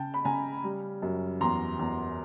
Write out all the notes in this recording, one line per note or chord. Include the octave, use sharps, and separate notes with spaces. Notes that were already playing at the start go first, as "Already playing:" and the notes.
Already playing: C#3 G5 A5
B5
C#3 G#5 A#5
G3
F#2
E2 A#5 C6
E2